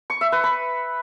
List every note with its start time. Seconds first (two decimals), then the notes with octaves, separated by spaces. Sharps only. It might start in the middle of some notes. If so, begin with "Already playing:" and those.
0.10 C#6
0.21 E5
0.32 B4
0.44 B5